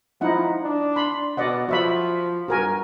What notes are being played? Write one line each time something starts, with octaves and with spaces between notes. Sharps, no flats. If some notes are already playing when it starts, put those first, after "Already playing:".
F3 D#4 E4 F#5
D4
B5 C6
B2 D5 D#5 F#5
F3 F#4 E5 B5
G2 F#4 A#4 G#5